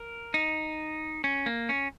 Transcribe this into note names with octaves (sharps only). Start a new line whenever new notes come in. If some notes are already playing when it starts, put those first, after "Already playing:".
Already playing: A#4
D#4
C#4
A#3
C#4